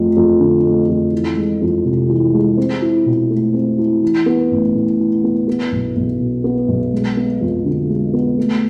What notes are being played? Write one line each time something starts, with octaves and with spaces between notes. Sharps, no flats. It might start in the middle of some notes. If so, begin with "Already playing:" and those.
Already playing: F2 A3
F2
D3
A3
F2
E3
G#3
F2
C3
E3
G#3
C4
E4
B2
A3
C4
E4
E3
B3
A1
A2
E3
B3
B3
B1
B1
B2
B3
B1
G#3
B3
F2
D3
G#3
B3
A3